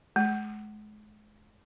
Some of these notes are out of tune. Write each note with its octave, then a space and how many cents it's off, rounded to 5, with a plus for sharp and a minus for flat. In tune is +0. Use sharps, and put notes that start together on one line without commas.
G#3 +35